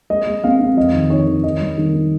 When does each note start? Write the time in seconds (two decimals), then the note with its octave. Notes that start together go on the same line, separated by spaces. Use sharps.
0.10 G#3 D#5
0.27 G#3
0.44 C4 F5
0.61 C4
0.77 F2 D#5
0.94 D#3
1.10 D#3 C#5
1.27 D#3
1.43 D#3 D#5
1.61 G3
1.78 D#3
1.94 D#3